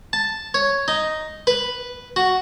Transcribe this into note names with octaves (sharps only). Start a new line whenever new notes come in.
A5
C#5
D#4
B4
F#4